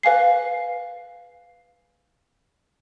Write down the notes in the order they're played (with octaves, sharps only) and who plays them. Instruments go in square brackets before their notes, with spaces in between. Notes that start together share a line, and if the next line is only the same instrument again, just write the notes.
[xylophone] B4 F5 G#5 C7